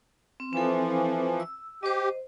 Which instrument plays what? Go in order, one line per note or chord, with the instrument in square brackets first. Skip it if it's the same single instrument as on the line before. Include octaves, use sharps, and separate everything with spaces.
[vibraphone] C4
[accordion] E3 F3 [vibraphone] C4 A4
[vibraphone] E6
[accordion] G4 [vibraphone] C5 D#5